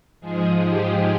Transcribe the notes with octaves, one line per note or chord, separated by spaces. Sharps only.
G#2 F3 G#3 G#4
G4